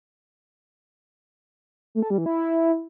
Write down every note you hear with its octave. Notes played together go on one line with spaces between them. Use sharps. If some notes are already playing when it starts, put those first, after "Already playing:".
A3
A4
G3
E3
E4